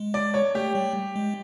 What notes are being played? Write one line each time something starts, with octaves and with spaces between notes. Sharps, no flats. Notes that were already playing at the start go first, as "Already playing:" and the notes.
Already playing: G#3
D5
C#5
A3 G4
G3
G#3